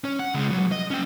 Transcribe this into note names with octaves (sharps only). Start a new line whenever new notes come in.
C#4 C#5
F#5
C#2 G#3
C2 F#3
D#5
C#4 G5